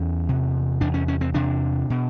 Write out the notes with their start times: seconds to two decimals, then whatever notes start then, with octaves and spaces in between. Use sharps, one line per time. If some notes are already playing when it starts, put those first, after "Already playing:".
Already playing: E2 C#4
0.29 E2 C3
0.81 E2 C3 D4
0.94 C#4
1.08 C#4
1.21 C4
1.34 E2 C3 D4
1.90 B2